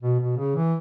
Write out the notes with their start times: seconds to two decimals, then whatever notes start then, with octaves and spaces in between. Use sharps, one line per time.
0.02 B2
0.20 B2
0.37 C#3
0.56 E3